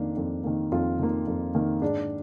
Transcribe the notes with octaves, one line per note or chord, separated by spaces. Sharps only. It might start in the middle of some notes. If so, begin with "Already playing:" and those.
Already playing: F2 D#3 A#3 D4
F2
D#3 A#3
F2 F4
D#3 A#3
F2
D#3 A#3
G#2 D4